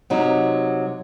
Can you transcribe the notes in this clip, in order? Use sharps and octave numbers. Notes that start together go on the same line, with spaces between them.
C3 F#3 D#4